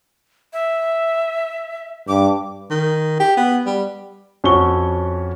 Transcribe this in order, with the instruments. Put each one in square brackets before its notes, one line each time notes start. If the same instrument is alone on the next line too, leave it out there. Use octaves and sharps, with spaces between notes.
[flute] E5
[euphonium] G2 [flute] D6
[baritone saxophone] D#3
G4
B3
G3
[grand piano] F2 C#4 F#4 C#5 C#6 G7